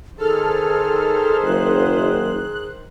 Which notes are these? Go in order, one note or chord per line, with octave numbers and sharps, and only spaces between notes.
D#3 G#4 A4 C5 F6
F#1 F#6